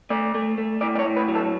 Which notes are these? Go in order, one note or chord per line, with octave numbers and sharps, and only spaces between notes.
A3 D5
A3
A3
A2 D5
D5
C#5
A2
B4
F#3
A4